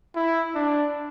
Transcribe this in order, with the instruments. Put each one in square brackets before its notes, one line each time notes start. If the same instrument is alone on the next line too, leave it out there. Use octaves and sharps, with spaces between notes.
[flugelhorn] E4
D4